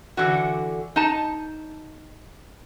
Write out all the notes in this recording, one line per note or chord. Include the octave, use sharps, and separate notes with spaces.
D3 E3 F#4
D#4 A5